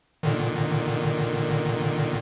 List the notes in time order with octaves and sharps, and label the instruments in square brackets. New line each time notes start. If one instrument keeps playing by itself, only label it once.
[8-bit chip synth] A#2 D3 D#3